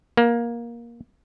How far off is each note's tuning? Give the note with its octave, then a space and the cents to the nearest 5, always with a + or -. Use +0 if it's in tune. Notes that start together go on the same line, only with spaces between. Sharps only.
A#3 +15